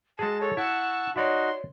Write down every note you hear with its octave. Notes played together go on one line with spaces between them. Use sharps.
G#3 F#4 G#4 A5
A4 C#5
E4 F#5 A5 C#6 E6
D#4 F#4 C#5 D5 E5 C6